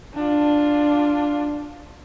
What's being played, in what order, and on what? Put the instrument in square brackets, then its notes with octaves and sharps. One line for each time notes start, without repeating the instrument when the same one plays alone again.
[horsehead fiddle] D4 F4